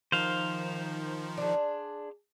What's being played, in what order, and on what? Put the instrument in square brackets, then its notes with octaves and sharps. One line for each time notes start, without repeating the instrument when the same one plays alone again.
[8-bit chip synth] D#3 F3 D#4 [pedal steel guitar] C5 F5
[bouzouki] D4 G#4